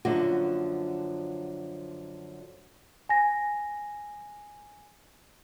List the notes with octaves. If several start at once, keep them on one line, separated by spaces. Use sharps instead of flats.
F#2 D3 F3 A#3 F#4
G#5 A#6